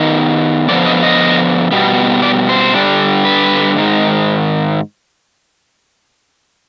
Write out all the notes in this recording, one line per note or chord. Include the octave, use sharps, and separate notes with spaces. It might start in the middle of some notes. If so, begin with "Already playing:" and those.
Already playing: D#3 B3 D#4
D3 F3 B3 D5
D#5
D#5
B2 G3 B3
D5
C5
D3 G3 D4
B4
G#2 D#3 G#3